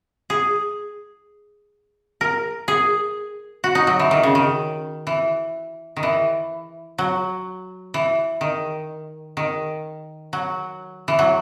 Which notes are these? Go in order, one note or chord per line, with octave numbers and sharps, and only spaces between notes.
G#4
A#4
G#4
F#4
D#4
F#3
E3
D#3
C#3
D#3
E3
D#3
E3
F#3
E3
D#3
D#3
F#3
E3
F#3